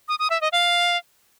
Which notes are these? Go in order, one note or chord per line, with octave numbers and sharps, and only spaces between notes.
D#6
D#6
E5
D#5
F5